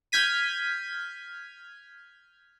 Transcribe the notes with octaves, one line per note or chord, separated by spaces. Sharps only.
F6 G6 G#6 B6 D#7